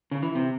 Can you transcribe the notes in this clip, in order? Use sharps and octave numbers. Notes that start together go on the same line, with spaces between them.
C#3
E3
C3